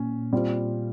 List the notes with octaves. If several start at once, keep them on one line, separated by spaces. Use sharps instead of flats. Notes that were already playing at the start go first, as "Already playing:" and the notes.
Already playing: A#2 C#4
G3 C4 F4